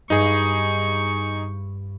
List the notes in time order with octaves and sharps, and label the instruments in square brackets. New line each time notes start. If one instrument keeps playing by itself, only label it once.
[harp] G2 [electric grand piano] D#4 G#4 [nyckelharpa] C#6